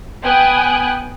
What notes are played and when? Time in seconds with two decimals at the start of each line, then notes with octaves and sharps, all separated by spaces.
0.23 B3 G5 G#5 D#6 F#6